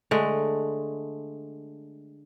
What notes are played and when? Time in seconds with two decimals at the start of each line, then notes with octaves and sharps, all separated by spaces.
0.11 D3 G#3 A3